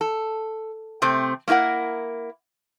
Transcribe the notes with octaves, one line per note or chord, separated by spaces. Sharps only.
A4
C3 A3 C4
A#3 C#4 E4 A#4 F#5